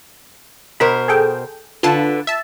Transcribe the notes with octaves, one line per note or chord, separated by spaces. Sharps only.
B2 A#4 C5 B5
G#4 A4 G5
D3 F4 B4 A5
E5 A5